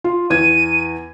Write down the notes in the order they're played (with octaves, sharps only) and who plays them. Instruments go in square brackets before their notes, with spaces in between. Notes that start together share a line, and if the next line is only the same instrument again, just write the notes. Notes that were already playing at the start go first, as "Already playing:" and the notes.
[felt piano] F4
[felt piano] E2 G#6 [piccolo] D#7